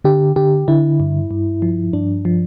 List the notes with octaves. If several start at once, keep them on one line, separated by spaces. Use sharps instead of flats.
D3 G4
D3 G4
D3 E4
G2
G2
F3
G2 D4
F3